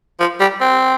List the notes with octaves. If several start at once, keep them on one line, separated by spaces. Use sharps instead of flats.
F3
G3
C4